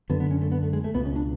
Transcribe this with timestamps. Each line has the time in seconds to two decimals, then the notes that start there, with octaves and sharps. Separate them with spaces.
0.10 F#2 D3 B3
0.20 B3
0.31 C#4
0.42 A3
0.52 B3
0.63 A3
0.73 G#3
0.84 A3
0.95 C#2 B2 B3
1.05 C#4
1.16 D4